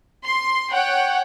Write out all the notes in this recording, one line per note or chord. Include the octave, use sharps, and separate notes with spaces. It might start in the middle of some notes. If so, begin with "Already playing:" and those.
C6
C#5 F#5 G5